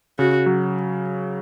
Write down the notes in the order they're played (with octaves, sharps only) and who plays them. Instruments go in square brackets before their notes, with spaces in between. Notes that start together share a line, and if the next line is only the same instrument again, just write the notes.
[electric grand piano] C#3 [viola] F#4
[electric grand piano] F#3